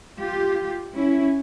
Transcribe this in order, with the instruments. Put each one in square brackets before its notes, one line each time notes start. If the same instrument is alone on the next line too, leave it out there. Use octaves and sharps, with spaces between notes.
[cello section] F4 G4
C#4 E4